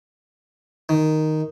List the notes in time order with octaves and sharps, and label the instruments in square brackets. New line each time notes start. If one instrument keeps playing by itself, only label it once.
[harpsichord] D#3